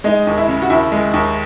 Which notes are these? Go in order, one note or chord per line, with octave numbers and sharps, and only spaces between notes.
G#3 D#4
D#2
E4
C#3
F#4
D#2 E4
G#3
D#2